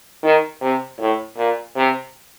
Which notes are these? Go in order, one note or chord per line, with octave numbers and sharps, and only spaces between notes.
D#3
C3
A2
A#2
C3